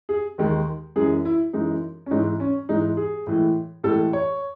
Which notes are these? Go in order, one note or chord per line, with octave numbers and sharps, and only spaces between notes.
G#4
D#2 D#3 G#3
F#2 E3 G#3 G#4
E4
F#2 E3 G#3 D#4
C#4
G#2 E3 G#3 D#4
C#4
G#2 E3 G#3 D#4
G#4
A2 E3 G#3
A2 E3 G#3 A4
C#5